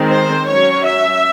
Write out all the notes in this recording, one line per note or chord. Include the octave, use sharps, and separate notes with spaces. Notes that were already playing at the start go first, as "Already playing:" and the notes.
Already playing: D#3 G#3 C4
C5
F#3 C#4 C#5
E5